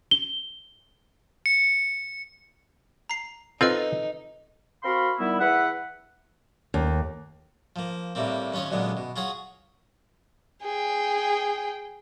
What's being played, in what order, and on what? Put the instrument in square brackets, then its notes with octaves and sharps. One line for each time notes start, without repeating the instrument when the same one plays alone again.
[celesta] G7
[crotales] C#7
[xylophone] A#5 C7
[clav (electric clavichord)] C4 F4 [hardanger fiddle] D#4 [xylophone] A4 B4 D#5
[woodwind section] C4 F#4 A#4 F5 B5 C6
D#3 G3 B3 E4
E2 B4 E5 F#5
[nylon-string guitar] D#2
[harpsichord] F3 A#3
A2 C3 G3 A#3 C4
D#2 C#4 F4 C#5 D#5
F#2 A#2 D3 G#3 B3
B2
F4 F#4 G#4 C#5 F#5
[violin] G#4 G5